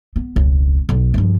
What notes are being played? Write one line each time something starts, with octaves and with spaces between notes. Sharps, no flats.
B3
E1 C#2
B1
G2 F3